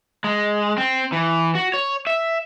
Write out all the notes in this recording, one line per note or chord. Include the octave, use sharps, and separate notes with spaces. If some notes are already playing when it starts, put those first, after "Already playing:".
G#3
C4
E3
F#4
C#5
E5